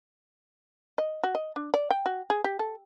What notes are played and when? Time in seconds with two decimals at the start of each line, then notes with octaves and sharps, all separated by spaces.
0.98 D#5
1.24 F#4
1.35 D#5
1.56 D4
1.74 D5
1.91 G5
2.06 F#4
2.30 G#4
2.44 G4
2.59 A4